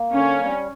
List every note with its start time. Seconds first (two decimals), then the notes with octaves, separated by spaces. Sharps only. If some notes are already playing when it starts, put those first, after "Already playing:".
Already playing: A#3
0.12 D3 C#4
0.40 G3